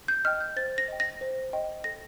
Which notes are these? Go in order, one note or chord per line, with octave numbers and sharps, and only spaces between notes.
G6
D#5 G5 F6
G6
C5 A6
A#6
D#5 G5
A#6
C5
D#5 G5
A4 A#6